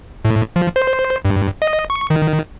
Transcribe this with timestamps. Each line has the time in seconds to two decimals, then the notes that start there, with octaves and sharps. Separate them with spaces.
0.25 A2
0.56 F3
0.76 C5
1.25 G2
1.62 D#5
1.90 C#6
2.10 D#3